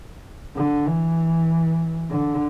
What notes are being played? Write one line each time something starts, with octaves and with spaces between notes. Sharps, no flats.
D3
E3
D3